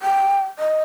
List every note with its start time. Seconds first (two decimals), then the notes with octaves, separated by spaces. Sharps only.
0.02 G5
0.59 D#5